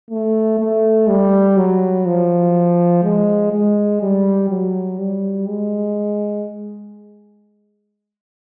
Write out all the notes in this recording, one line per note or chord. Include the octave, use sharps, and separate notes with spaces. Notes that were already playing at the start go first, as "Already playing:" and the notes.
A3
A3
G3
F#3
F3
G#3
G#3
G3
F#3
G3
G#3